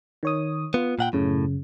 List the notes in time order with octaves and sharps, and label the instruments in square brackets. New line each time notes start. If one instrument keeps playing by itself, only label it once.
[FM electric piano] D#3 C#5 D#6
[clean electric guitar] B3 [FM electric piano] F4
[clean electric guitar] A#2 F#5 G5
[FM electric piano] F#2 C#3 [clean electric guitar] A2